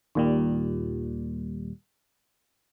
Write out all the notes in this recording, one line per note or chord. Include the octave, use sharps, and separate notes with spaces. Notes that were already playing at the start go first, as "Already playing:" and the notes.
D#2 A#2 G3